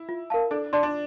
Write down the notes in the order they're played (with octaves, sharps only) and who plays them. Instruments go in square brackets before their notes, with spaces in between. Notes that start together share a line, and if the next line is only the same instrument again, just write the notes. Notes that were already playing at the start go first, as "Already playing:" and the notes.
Already playing: [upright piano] E4
[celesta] F4
A#4 F5 A5
[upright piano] D4 [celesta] A4
[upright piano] D4 [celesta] D5 A5 C6
[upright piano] D4